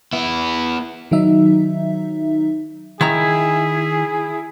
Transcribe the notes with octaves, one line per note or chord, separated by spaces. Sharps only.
B3 E4
D#3 F#3 D#4 E5
D#3 E4 G#4 A#5